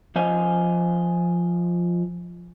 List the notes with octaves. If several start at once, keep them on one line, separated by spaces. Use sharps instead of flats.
F3 C5 D#5 F5 G#5